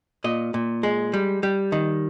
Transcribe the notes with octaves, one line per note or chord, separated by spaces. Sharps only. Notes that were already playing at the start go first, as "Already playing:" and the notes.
A#2 D#5
A#2
G#3
G3
G3
D#3